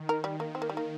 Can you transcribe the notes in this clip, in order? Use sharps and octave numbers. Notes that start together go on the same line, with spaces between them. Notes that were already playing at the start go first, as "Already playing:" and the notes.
Already playing: D#3
A#4
G3
A#3
C4
A#3
G3
A#3